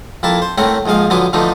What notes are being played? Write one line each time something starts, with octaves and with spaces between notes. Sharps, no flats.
F2 A#3 E4 A5
C5
A2 A3 C4 A#4 C#5 F#5
A#1 G#2 F3 G#4 F5
D3 F3 F#3 B3 G#5 D6
D3 E3 F3 A3 D4 D#4